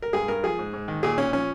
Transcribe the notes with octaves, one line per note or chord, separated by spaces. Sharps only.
A#4
G2 G#4
G2 A#4
F3 G#4
G#2
G#2
D#3
A#2 G#4
A#2 C#4
F3 C#4